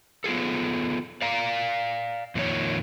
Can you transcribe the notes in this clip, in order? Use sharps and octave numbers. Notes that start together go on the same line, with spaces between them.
B3 F4 G#4 A4
D5 F5 A#5
F2 A#2 D#3 F3 C#5